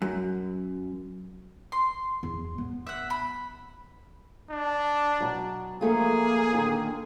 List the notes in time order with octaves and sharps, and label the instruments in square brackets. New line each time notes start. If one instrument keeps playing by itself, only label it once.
[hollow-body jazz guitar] F#2
[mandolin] C6
[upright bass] E2
D1 B3
[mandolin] E5 F#5
B5
[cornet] D4
[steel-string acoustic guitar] B2 F#3
[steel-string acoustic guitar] F3 A3 F4 [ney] A#3 [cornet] G#4
[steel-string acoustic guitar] A#2 D3 D#3